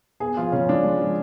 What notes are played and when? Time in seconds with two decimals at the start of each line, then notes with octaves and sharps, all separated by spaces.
0.20 B3 G#4
0.37 F3 F4
0.52 C#3 C#4
0.69 G#3 D4
0.84 G#3
1.00 F3